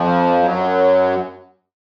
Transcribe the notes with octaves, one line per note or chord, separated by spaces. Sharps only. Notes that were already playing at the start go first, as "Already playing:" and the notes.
Already playing: F2 F3
F#2 F#3